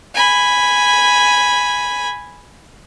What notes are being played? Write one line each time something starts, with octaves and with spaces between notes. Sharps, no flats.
G#5 B5